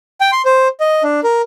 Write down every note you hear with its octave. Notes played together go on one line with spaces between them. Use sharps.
G5
C6
C5
D#5
D4
A#4